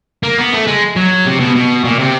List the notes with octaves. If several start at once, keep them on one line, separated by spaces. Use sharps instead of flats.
A#3
B3
A3
G#3
F#3
C3
B2
B2
A#2
C3